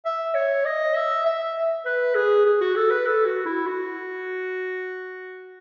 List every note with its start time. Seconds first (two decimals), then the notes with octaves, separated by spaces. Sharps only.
0.05 E5
0.34 C#5
0.65 D#5
0.95 E5
1.26 E5
1.85 B4
2.15 G#4
2.45 G#4
2.61 F#4
2.76 A4
2.90 B4
3.06 A4
3.25 F#4
3.45 E4
3.66 F#4